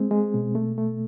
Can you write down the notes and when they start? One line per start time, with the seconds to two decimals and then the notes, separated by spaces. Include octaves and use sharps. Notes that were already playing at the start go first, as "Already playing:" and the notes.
Already playing: G#3 C4
0.11 G#3
0.34 B2
0.55 A3
0.78 A3